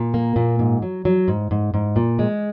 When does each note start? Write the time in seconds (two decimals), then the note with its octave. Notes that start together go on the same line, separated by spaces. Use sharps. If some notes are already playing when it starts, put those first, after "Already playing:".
Already playing: A#2
0.14 A#3
0.36 A#2
0.59 G#2
0.82 F#3
1.05 F#3
1.28 G#2
1.51 G#2
1.74 G#2
1.96 A#2
2.19 G#3